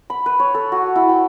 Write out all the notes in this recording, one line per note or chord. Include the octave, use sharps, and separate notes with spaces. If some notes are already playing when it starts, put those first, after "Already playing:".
B5
B4
C#5
A4
F#4
E4
G5